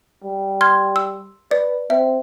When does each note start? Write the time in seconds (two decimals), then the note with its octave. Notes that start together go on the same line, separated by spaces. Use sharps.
0.24 G3
0.61 C6 F6 G#6
0.96 E6
1.51 B4 D5
1.90 C4 E5